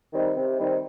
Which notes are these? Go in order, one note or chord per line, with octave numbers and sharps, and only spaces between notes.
D#3 G3 C4 D#4
C3
D#3 G3 C4 D#4